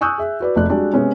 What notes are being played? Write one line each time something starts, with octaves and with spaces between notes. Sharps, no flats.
G#5 C#6 D#6 E6 F#6 G6
G#4 E5
F#4 B4 D5
F1 A3 D5 F#6
G3 G#3 D4 F#4
C3 G#3 B3 C#4